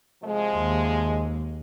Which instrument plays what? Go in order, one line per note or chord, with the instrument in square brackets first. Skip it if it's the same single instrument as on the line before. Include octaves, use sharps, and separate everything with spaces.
[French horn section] C3 F3 G#3
[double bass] D#2